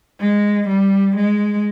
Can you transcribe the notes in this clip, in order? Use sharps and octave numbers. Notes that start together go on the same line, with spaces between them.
G#3
G3
G#3